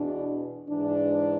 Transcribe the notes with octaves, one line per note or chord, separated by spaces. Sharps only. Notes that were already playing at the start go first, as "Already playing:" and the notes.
Already playing: E2 B2 D4
G#2 E3 D4